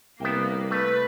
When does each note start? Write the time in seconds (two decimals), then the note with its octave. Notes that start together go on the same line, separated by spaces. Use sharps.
0.20 C2 A#3 B3 E5 G5
0.71 A3 B4